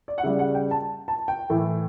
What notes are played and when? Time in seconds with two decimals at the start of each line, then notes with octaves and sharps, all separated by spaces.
0.08 D5
0.18 F#5
0.23 C#3 G3 E5
0.39 F#5
0.55 G5
0.71 A5
1.08 A5
1.28 G5
1.50 A2 E3 A3